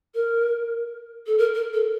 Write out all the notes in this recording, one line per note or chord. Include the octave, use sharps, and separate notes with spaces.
A#4
A4
A#4
A#4
A4